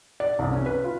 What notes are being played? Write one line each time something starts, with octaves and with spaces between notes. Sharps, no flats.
D5
C2
C#4
B4
F4